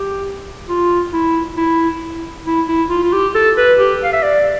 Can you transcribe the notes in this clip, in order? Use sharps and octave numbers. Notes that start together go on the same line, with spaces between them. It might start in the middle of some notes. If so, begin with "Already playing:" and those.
Already playing: G4
F4
E4
E4
E4
E4
F4
F4
G4
A4
B4
G4
F5
E5
D5